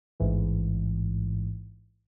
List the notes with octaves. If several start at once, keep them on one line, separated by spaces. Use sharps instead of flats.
A1 G#2 E3